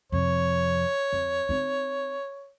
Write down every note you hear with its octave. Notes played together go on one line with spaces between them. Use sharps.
F2 C3 C#5
F2
C4 D#4